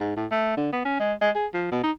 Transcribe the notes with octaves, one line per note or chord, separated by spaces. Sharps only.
G#2
A2
A3
D3
B3
C#4
G#3
G#3
G#4
F3
B2
D#4